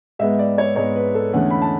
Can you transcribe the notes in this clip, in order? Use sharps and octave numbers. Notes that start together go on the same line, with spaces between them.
G#2 G#3 B3 E5
D5
C#5
G#2 G#3 B3 C#5
B4
A4
E2 D3 A3 C#4 F#5
B5
A5